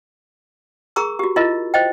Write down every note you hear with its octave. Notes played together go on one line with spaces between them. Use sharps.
G#4 A#4 A#5 C#6 D#6
F#4 G4
E4 F4 A#4 D#5
C5 D#5 G5